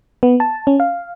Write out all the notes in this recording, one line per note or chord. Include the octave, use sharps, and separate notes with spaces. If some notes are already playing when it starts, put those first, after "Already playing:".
B3
A5
C#4
F5